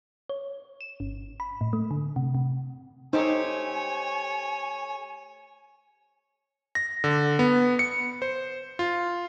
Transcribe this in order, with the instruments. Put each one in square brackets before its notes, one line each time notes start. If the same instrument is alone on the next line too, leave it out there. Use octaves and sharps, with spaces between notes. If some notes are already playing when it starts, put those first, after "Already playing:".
[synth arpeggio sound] C#5
E7
G1
B5
A2
A3
D3
C3
C3
[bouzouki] A3 G4 C5 [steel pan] D#4 [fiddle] C#5 [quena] G#5
[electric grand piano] A#6
D3
B3
C#7
C5
F4